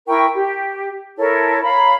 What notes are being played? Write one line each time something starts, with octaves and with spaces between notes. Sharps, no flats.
E4 A#4 G5 C#6
G4
E4 A4 A#4 C#5
C#5 F5 A#5 B5